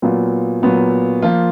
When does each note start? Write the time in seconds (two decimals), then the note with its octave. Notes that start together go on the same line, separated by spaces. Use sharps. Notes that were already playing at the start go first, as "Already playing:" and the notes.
0.02 A#2 F#3 B3 F4
0.62 A#2 F#3 B3 F4
1.22 F3 A#3 F4